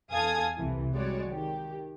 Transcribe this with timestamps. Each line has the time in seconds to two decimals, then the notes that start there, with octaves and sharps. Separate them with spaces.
0.11 E2 A4 F5 G#5 D#6 G#6
0.58 C2 C3 E3
0.94 G3 G#3 F#4 C#5 D5
1.29 D#3 G4